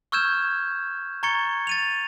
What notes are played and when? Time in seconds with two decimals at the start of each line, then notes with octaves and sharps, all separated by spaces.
0.12 C#6 E6 F6 G6 G#6 E7
1.23 A#5 C#6 G#6 A6 C#7 G7
1.67 A6 D#7 F7